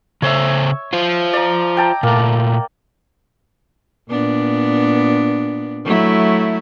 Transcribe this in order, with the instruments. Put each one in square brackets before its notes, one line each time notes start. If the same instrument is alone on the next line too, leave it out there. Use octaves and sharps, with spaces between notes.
[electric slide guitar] C#3 A4 C5 [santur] C#5 E5
[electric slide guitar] F4 C5
[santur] D5 A#5
G5 A5 A#5
[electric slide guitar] A#2 A3 [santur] A#3
[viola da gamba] A#2 B3 D4
F#3 A3 E4